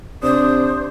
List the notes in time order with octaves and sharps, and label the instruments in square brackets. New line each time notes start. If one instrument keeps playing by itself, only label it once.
[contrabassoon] C3 [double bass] D4 [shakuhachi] C5 [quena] D#6